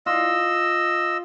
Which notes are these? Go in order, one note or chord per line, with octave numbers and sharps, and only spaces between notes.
F4 D#5 E6